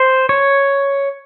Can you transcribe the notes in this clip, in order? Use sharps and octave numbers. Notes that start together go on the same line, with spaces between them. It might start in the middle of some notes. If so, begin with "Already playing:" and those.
Already playing: C5
C#5